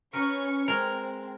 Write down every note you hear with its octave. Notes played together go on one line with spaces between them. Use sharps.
C#4 A#4 B4 C#6 C#7
G#3 C4 A#4